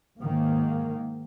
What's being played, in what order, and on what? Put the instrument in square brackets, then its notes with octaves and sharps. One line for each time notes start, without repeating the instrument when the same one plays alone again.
[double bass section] G#2 D#3 A#3